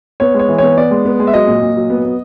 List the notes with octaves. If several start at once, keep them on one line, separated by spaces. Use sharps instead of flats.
B3 C#5
G#3 C#5
E3
B3 C#5
B3 D5
G#3
B3
G#3
E5
F#3 D#5
A#2
A#2
F#3
B3
B3